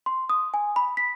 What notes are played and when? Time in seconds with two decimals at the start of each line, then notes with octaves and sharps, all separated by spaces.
0.06 C6
0.29 D#6
0.54 G#5
0.76 B5
0.97 B6